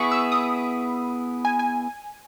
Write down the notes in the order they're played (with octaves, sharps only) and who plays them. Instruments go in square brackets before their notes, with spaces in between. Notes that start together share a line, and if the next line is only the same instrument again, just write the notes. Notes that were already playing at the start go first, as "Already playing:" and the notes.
Already playing: [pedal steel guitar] B3 E4 G#4 [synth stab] C#6
[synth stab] E6
D#6
G#5
G#5